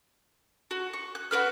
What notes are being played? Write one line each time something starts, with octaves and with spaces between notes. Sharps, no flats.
F#4
C#6
F#6
F#4 A#4 B4 F6